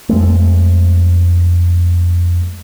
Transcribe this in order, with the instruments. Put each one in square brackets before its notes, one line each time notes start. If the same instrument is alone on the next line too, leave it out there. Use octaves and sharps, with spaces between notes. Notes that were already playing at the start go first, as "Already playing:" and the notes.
[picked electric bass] F2 G#3 A3